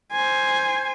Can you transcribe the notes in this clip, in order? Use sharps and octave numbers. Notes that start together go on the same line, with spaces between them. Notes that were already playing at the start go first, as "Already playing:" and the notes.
C5 G#5